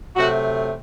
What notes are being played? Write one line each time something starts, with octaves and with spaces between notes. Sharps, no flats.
C3 F#3 A3 F#4